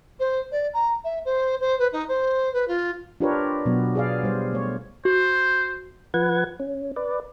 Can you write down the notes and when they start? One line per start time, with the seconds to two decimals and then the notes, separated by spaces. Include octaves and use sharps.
0.19 C5
0.51 D5
0.73 A#5
1.04 E5
1.25 C5
1.60 C5
1.79 B4
1.92 D#4
2.08 C5
2.53 B4
2.68 F4
3.20 D4 F4 G4 A#4 B4 C#5
3.66 B2 F#3 B3
3.95 G#4 D5 F5
4.23 G3 C5
4.53 A3 C#5
5.05 F#4 C5
6.14 F3 B4 F#5 G#6
6.60 C#4
6.96 B4 D5